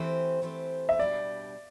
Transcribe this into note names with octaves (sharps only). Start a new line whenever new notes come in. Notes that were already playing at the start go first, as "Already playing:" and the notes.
Already playing: E3 A3 C4 G4 C5
E3 A3 C4 G4 C5
E5
B2 G3 D4 G4 D5